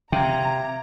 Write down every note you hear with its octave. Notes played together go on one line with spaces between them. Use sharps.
C3 E5 F5 G5 A#5 G#6